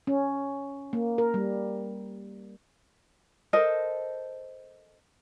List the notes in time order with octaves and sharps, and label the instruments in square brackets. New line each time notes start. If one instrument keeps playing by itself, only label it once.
[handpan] C#4
A#3
A#4
G3
[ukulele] A4 A#4 C5 D#5